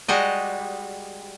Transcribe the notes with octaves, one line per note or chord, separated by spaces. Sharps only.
G3 G#3 F#4 D#5